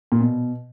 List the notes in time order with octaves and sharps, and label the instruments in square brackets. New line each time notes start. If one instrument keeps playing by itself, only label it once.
[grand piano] A#2
B2